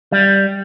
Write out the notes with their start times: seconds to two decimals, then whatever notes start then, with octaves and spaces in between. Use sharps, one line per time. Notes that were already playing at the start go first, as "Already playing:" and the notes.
0.12 G3